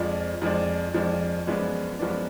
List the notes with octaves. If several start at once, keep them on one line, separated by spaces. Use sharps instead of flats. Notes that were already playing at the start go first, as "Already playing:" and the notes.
Already playing: F2 F3 G#3 D4
F2 F3 G#3 D4
F2 F3 G#3 D4
F#2 F3 G#3 B3 D4
F#2 F3 G#3 B3 D4